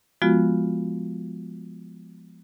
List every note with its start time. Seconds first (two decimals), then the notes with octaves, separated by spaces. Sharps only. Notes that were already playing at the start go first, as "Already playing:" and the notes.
0.22 F3 G#3 B3 F4 F#4